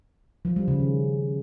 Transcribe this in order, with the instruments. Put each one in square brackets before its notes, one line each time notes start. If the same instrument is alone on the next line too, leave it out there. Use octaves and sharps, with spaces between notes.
[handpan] F3
G3
C#3
D#3